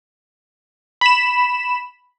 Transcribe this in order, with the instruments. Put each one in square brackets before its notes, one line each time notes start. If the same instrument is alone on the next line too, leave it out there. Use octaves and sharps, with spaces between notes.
[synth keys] B5 E7